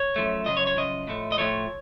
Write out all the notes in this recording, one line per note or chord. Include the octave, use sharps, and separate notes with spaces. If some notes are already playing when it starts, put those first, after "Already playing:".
Already playing: C#5
F#2 F3 A3
F#2 C#3 F3 D#5
C#5
C#5
F#2 C#3 F3 D#5
A2 F3 A3
D#5
A2 F3 A3 C#5